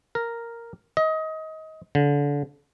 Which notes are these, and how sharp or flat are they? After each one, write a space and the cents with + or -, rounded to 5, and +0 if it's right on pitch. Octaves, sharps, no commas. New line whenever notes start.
A#4 -5
D#5 +25
D3 -30